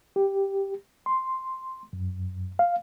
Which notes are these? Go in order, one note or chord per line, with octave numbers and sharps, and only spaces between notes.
G4
C6
F#2
F5